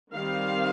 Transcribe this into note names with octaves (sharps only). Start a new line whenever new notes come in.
D#3 G3 C4 F5